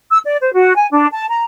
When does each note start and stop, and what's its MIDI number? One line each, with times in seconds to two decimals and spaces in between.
0.12 0.19 88
0.24 0.36 74
0.41 0.53 72
0.53 0.76 66
0.76 0.87 80
0.91 1.06 62
1.12 1.27 81
1.28 1.44 82